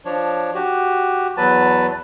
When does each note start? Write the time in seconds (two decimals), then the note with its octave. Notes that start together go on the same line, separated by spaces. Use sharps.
0.05 F3 D4 C#5
0.55 F#4 G4
1.37 E2 F#3 B4 A5